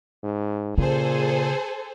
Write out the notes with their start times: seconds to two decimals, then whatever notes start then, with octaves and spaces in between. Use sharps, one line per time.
0.23 G#2
0.78 A#2 C#3 G#4 A4 C5